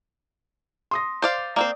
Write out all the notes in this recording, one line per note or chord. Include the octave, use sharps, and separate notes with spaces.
C6 D#6 A#6
C5 D5 F5
A#3 C4 C5 D5